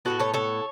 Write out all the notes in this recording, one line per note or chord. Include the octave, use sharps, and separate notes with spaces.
A2 G#3 B3 F#4 A4
A4 C#5
A4 C#5